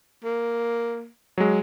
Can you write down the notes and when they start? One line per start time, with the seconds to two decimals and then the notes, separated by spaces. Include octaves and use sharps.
0.24 A#3
1.38 F#3 G#3